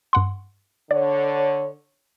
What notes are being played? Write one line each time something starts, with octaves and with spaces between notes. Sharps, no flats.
G2 F#5 C6
D3 C#5 D5